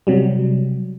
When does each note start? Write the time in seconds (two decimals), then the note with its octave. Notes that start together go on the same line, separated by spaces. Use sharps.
0.07 C3 F#3 G3